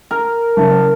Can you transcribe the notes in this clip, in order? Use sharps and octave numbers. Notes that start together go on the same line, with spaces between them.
A#4
F#1 A5